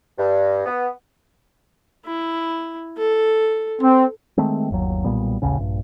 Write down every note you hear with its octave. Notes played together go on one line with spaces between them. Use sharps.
G2
B3
E4
A4
C4
D#3 G#3 A3 C4
G1 D#2 F#3
B1 A#2 G3 B3
A1 D#2 C#3 C#4
A#1 G2